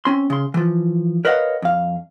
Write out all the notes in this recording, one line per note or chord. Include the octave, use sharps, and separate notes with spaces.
C4 C#4 C6
C#3 C6
E3 F3
A#4 B4 C#5 D#5 F5 F#5
F2 F5